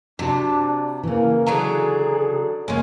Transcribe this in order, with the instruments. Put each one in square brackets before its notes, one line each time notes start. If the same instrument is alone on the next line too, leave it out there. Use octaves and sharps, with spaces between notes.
[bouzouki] C3 [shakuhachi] D4 [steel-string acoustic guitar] F#4 D5 A5
[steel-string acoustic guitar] C#3 E3 [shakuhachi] A#3
[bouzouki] D3 F#3 A#5 [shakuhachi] G#4
[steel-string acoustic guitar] C#3 A#3 [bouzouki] G#3 C#4 [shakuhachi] C#5